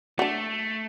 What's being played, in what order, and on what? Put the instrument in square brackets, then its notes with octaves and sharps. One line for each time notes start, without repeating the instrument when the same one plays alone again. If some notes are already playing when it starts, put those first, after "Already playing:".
[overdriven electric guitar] A3 [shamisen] D4 F#4